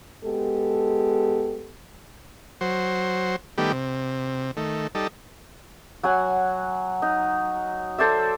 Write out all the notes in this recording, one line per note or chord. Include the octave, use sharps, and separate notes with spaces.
G#3 B3 G4 A4
F#3 C5
D#3 G3 A3 B3 G4
C3
D#3 A3
G3 D#4 A4
F#3 F#5 G#5
D#4
A4 C5 D5 E5